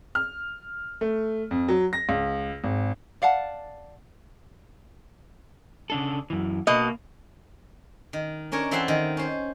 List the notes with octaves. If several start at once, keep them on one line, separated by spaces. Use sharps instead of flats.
F6
A3
F2
F#3
A#6
C#2
G#1
D5 F5 F#5 A5
C#3 D4 A4
F#2 E3
B2 A#3 D#5
D#3
C#4 D4 A#4 C#5
E3 C4 A4 E5 F#5 C6
D#3
C#4 C5